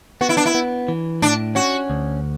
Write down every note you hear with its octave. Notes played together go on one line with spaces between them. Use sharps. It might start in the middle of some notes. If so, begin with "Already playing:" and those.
B3 F#4
E4
D4
E4
B3
E3
A2 D4
C#4 F#4
D2